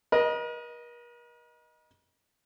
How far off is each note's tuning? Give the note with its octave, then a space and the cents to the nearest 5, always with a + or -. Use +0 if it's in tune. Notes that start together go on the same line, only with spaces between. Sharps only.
A#4 +45 D#5 +0